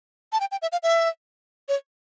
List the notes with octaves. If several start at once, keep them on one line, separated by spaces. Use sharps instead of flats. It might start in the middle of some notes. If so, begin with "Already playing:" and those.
A5
G5
G5
E5
F5
E5
C#5